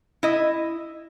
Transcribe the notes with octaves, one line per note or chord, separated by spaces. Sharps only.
E4 D#5